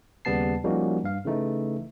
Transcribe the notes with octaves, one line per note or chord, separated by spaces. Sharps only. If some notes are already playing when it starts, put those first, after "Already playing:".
D#2 C#3 G3 B3 A5 C7
F3 G3 A#3 C#4 D#4 F#4
G2 F5
C#3 E3 A3 D#4